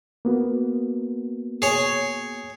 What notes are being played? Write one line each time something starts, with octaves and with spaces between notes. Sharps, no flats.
A#3 B3 F#4
G#4 C#5